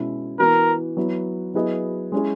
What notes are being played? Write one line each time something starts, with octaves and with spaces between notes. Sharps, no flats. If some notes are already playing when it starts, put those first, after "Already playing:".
Already playing: B2 G#3 C#4 E4
E3 B3 F#4 A#4
F#3 B3 E4
F#3 B3 E4 G#4 D#5
G#3 C#4 E4 G#4